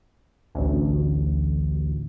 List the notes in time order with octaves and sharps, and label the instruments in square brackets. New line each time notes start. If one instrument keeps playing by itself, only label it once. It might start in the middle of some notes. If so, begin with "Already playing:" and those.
[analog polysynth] A1 D2